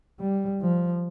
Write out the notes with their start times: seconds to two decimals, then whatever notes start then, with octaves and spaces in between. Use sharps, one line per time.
0.20 G3
0.61 F3